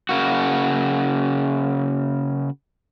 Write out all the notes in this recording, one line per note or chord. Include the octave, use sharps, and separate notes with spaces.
C#3 A#3 F#4